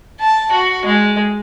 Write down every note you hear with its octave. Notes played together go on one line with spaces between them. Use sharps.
A5
F#4
G#3